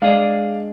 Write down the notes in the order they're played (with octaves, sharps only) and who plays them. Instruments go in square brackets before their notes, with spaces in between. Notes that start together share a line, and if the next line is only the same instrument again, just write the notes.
[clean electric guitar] G#3 D4 G#4 D#5 [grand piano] D5 F5